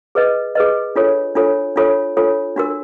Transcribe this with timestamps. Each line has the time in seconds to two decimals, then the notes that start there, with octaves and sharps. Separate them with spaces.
0.15 G#4 B4 D#5
0.55 G#4 B4 D#5
0.96 D4 F4 A4 C#5
1.35 D4 F4 A4 C#5
1.76 D4 F4 A4 C#5
2.17 D4 F4 A4 C#5
2.56 D4 F#4 A#4